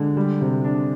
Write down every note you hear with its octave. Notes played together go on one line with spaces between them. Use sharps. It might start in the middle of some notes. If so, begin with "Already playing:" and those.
Already playing: D3 G#3
G3
C3
D4